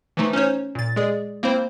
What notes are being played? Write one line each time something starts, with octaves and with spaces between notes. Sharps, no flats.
E3 F3 A3 D#4
C#4 D#4 C5 C#5
A#2 A6
G#3 G#4 D5
A#3 C4 E4 C5